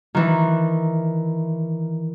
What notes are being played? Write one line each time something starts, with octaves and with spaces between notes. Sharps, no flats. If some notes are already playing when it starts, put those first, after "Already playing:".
D#3 E3